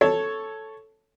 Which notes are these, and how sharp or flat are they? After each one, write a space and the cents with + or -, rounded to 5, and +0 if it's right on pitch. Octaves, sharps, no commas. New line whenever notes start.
A4 +0 C#5 +0